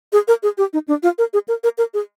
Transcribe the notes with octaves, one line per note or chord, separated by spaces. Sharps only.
G#4
A#4
G#4
G4
D#4
D4
F4
A#4
G#4
A#4
A#4
A#4
G#4